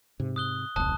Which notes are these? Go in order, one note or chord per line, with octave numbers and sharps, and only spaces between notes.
G#2 C3
D#6 F#6 G7
D#1 C2 A5 D#6 F#6